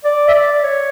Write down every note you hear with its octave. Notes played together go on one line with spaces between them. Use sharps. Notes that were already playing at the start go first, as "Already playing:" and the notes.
D5
E5
D5
C#5